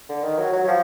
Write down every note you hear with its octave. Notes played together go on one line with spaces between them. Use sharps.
D3
D#3
F#3
F#3
F#3
F3